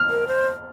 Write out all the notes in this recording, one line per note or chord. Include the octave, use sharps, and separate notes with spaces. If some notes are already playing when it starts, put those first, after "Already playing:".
Already playing: F6
A#4
C5